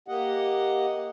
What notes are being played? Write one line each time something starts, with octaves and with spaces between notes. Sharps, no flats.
A#3 G4 D#5 F#5